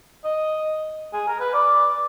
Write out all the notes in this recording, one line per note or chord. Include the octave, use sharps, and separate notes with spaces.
D#5
G#4
A#4
B4
D5